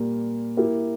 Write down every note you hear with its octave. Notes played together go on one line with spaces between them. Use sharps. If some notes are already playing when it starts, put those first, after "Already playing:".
Already playing: A#2 G3 A#3
A#3 E4 G4 A#4